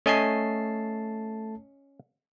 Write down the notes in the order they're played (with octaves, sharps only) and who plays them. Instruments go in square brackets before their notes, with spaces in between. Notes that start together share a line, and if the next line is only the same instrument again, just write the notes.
[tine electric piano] A3 A5 C7 [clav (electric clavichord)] C#4 D#5 G#5